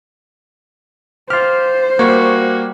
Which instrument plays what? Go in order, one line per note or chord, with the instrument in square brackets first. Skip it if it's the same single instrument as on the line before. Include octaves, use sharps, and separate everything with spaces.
[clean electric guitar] F4 G4 [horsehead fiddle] C5 [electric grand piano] F6
[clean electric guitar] G3 C#5 [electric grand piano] A#3 [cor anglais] F#4